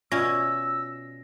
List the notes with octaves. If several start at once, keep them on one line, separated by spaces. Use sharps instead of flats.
B2 C#4 F4 D5 E5 E6 A#6